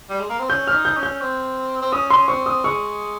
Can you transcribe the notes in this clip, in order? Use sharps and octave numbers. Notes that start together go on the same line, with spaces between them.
G3
G#3
A#3
C4
C#4 G6
F6
D#4
G6
C#4
G6
C4
C4
C#4 D#6
C6
C4 C#6
D#6
G#3 C#6